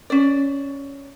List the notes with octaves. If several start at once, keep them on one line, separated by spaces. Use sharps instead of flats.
C#4 D5